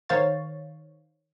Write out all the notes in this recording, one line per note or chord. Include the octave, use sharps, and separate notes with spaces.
D#3 C5 C#5 F5 C#6 A6